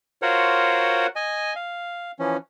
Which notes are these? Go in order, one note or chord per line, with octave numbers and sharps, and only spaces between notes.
F4 F#4 A#4 C5 C#5 F#5
D#5 G#5
F5
E3 F3 C#4